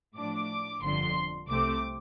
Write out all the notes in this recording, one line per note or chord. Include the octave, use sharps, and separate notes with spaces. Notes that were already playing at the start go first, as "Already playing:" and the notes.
A2 F3 D4 D6
G1 F2 D3 F3 C6
C2 C3 A3 C4 D6